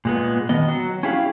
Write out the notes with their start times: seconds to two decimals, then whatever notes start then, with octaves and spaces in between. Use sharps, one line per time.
0.05 A#2 G#3 B3
0.49 D#3 B3 D#5
0.68 F#3 F#4
1.03 C#4 E4 G4 G#4 F5